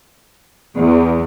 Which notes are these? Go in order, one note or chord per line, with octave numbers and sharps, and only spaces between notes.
E2